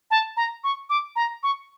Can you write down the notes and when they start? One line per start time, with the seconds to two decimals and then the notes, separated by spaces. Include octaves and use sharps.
0.11 A5
0.37 A#5
0.64 C#6
0.90 D6
1.16 A#5
1.43 C#6